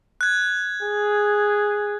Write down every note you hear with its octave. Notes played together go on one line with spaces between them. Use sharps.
F#6 G#6
G#4